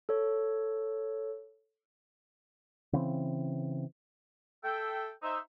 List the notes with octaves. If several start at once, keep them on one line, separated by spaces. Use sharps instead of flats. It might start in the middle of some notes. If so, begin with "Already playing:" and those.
A4 C#5
C#3 E3 C4
A4 E5 G5
D#4 C5 E5